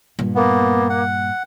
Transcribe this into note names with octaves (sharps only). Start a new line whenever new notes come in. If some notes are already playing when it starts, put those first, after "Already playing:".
G2 A#2
A#3 B3
F#5